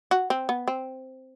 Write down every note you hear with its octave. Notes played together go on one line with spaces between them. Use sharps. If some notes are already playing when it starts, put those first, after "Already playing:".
F#4
C4
B3
C4